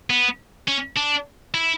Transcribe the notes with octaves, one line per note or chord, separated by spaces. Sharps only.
B3
C#4
D4
E4